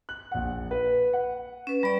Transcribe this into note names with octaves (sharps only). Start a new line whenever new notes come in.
F#6
A#1 F#5
B4
F#5
C#4 B4
G3 D5 B5